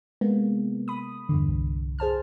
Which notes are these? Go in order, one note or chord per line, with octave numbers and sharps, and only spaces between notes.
C3 G#3 A#3 B3
B5 D#6
E2 G2 D3
C2
G#4 C5 A5 F6